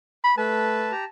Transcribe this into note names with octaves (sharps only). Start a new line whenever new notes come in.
B5
A3 B4 A5
G4 A#5